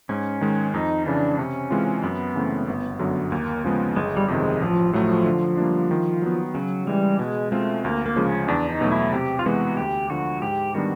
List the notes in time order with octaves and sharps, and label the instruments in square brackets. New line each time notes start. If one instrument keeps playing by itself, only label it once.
[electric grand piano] G#2 [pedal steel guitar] C#4
[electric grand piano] D#3 G#3
[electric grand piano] F2 [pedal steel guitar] D#4
[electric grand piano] C#3 E3 [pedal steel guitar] D4
[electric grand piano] C3 [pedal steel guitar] C#4
[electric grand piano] E3 G#3 C4 F4
[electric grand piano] F#2 [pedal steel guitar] B3
[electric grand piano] C#3 E3 A3 C4
G1
F#2 D3 F#3
[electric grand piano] D#2 [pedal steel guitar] A#3
[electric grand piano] C#3 F3 G#3 B3
[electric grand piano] G1 [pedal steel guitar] G#3
[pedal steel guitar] G3
[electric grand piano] F2 C3 D#3 [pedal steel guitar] G#3
[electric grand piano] A1 [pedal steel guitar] F3
[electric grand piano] A2 F#3 A3 [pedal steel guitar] F3
[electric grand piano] D3
G3 A#3 D4
D#3
F#3 B3
[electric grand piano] C#3 [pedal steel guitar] F#3
[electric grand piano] E3 G#3 [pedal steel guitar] G3
[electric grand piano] B2 [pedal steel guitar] G#3
[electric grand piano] G#3 C4 F4 [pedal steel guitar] A3
[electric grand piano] D2 [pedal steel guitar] A#3
[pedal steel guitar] A#3
[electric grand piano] C#3 F3 G#3
[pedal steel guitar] C#4
[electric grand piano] E2 [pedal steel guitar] D4
[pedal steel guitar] D#4
[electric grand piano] B2 F#3 A3
[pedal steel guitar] E4
[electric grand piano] C3 [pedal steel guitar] G4
[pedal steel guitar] F4
[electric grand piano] E3 G#3 B3 [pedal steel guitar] F#4
[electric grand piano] D2 [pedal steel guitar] G4
[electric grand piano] D3 F3 [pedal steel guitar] F#4
[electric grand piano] G#2 [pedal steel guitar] G4
[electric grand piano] D#3 G3 B3 D4 [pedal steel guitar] F#4